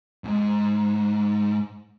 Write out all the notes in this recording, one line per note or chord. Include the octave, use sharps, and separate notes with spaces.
F2 G#2